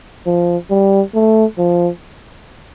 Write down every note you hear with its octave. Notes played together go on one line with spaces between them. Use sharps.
F3
G3
A3
F3